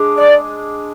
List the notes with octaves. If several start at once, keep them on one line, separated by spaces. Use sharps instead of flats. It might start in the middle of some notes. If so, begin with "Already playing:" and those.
Already playing: G#3 D4 G#4
D5